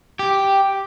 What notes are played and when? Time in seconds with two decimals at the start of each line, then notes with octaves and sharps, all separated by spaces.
0.19 G4